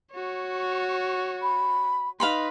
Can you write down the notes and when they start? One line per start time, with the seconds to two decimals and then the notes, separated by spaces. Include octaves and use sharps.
0.13 F#4 C#5
1.42 B5
2.20 D#4 B4 F5 B5 C6